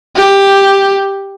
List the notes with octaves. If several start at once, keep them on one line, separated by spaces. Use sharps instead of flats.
G4